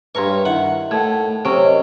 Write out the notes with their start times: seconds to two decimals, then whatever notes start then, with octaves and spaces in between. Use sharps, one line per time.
0.15 G2 E4 A#4 B4 C#5 C6 C#6
0.45 D#3 E4 E5 F#5
0.91 A2 F#5 A5 G#6
1.45 C3 F#3 C#4 C#6 D7
1.65 A#4 D#5